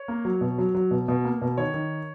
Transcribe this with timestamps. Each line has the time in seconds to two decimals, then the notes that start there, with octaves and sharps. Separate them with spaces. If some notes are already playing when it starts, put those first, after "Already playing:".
Already playing: C#5
0.08 A#3
0.25 F#3
0.41 B2
0.58 F#3
0.75 F#3
0.91 B2
1.08 B2
1.24 A#3
1.42 B2
1.58 D#3 C#5
1.74 D#3